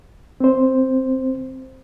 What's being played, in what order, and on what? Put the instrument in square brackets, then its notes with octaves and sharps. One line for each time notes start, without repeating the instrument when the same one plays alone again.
[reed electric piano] C4 C5